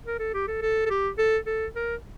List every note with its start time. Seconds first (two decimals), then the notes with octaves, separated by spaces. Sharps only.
0.06 A#4
0.19 A4
0.34 G4
0.48 A4
0.62 A4
0.86 A4
0.90 G4
1.18 A4
1.47 A4
1.76 A#4